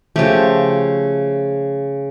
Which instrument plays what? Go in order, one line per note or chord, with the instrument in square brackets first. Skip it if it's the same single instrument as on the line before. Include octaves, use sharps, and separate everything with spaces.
[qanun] C#3 F3 A3 G4